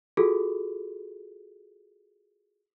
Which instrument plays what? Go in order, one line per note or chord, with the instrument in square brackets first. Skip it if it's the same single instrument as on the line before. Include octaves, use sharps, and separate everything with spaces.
[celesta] F4 F#4 G#4 A4